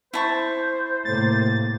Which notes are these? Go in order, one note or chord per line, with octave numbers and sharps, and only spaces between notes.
E4 C5 A5 C#6
A2 C3 A#3 A6